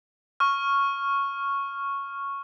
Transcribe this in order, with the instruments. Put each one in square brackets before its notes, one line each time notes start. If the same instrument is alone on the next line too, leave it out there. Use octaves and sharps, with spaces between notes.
[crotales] C#6 F6